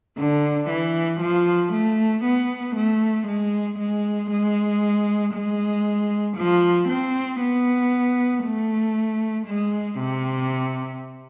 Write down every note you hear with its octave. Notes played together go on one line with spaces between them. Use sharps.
D3
E3
F3
A3
B3
A3
G#3
G#3
G#3
G#3
F3
C4
B3
A3
G#3
C3